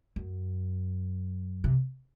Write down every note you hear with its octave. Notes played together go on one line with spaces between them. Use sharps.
F#2
C3